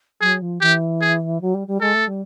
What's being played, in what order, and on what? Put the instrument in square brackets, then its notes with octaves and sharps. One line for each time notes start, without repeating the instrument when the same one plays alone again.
[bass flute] F#3 [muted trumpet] G#4
[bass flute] F3
[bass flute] E3 [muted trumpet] G4
[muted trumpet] G#4
[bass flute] F#3
G3
G3
[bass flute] G#3 [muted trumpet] A4
[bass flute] A3
G3